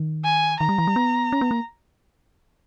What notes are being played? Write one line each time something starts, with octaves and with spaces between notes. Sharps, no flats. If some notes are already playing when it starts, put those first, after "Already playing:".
Already playing: D#3
G#5
D#3 A#5
G3
E3
G3
B3
C#4
B3
A#3